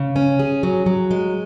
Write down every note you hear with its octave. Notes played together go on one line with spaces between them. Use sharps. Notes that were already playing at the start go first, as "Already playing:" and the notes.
Already playing: C#3
C#4
G#4
F#3
F#3
G#3